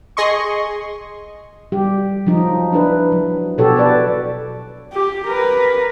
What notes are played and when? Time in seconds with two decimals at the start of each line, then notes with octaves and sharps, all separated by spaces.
0.17 G#4 D#5 C6 C#6
1.72 G3 G4
2.27 F3 F#3 D#4
2.72 D4 E4 B4
3.12 F#3
3.58 B2 F#4 G4 A4 C#5
3.76 A4 B4 D5
4.93 G4
5.27 A#4 B4